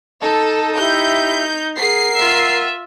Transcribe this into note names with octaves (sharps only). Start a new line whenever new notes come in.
D#4 A4
E4 G4 E5 G6
G#4 A#4 F#5 C7
F4 E5